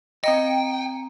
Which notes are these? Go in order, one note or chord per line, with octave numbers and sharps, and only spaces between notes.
C4 D#5 G5 A#5 C#7